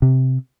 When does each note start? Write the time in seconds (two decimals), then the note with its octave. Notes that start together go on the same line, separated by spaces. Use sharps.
0.02 C3